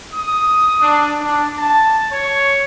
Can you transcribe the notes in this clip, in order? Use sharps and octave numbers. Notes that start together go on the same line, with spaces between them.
D#6
D4
D4
A5
C#5